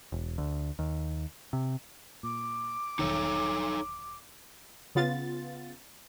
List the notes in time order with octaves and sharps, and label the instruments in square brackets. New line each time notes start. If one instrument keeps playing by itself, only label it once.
[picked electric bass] E1
D2
D#2
C3
[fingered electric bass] A#2 [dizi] D6
[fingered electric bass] E1 B1 D#3 [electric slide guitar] D#4 A4 C#5
[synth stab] C#3 B3 F4 A6